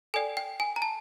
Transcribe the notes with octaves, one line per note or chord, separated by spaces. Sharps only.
A4 D5 G5 G#5
G5
G#5
A#5
A5